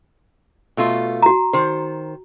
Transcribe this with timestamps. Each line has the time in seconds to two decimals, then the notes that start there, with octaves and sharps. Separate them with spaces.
0.77 B2 A3 F4
1.22 F#4 A#5
1.53 D#3 C5